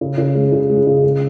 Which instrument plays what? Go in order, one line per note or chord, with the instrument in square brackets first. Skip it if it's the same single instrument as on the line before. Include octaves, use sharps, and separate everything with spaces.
[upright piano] C#3
C#3
G#3
C#3
G#3
C#3
C#3